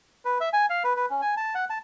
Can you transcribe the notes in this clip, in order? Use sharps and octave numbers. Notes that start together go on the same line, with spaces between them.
B4
E5
G#5
F5
B4
B4
C#4
G#5
A5
F#5
A5